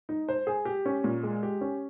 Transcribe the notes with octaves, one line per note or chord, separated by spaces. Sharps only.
D#4
C5
G#4
G4
C#4
A#2
G#3
G4
C#4